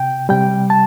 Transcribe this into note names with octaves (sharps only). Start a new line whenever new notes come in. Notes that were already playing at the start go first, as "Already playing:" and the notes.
Already playing: C3 G5
C3 G3 G5
A5